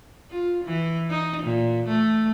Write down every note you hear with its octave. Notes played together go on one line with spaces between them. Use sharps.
F4
E3
D#4
A#2
A3